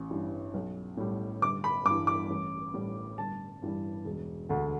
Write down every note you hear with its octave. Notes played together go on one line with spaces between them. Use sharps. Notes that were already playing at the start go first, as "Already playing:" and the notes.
Already playing: A1
G2 E3 G3
B1
A2 G3
G1 D6
B5
G2 D6
E3
D6
A1
A2 G3
G1 A5
G2 E3 G3
E1
D2 D3